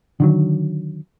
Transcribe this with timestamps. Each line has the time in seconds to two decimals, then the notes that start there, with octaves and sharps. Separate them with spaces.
0.20 D3 D#3 F#3